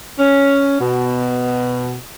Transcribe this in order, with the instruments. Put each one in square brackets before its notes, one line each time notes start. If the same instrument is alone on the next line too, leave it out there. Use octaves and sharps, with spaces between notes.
[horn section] C#4
B2